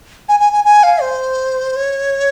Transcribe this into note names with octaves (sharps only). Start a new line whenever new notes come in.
G#5
G#5
G#5
G#5
F5
C5
C#5